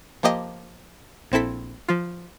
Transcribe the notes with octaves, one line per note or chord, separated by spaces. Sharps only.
F3 A#3 G4 D#5
A#1 C4 E4 A4 B6
F3 F4